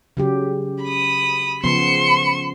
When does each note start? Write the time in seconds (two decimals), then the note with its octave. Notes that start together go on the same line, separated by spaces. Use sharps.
0.17 C#3 F#3 G4
0.84 B5 D#6
1.64 C#3 F3 B3 C6 C#7 E7